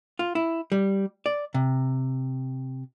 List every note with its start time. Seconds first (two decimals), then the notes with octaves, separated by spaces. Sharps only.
0.19 F4
0.35 E4
0.72 G3
1.26 D5
1.54 C3